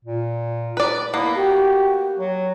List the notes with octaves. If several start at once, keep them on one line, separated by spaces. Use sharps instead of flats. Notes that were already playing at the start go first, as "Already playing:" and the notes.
A#2
B4 D5
A#3 B3 E4
F#4 G4
F#3